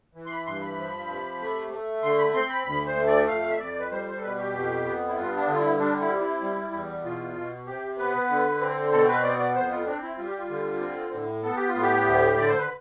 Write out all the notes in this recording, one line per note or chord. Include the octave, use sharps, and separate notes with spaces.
E3
C6
B5
G2 C6
B5
F3
C3
A3
A3
D3 C6
B5
C4 C6
B5
D2 B5
C5
A3
D5
F2 F5
F5
E5
F2 D5
B4
G3 C5
C5
A4
B2 B4
G4
F2
B3
E4
G2 F4
D4
D3
F4
E4
G3 D4
E4
C3
E4
G3
E2
B2 F4
B2
C3 G4
B3 B4
D3
C4
B2 A4
B4
B3 D5
D5
F2 C5
F4
C4 D4
E4
G3 F4
G4
F4
D3
C4
A2
B3 A4
G4
F4
A2
G4
D2
D3 D5
C5
B4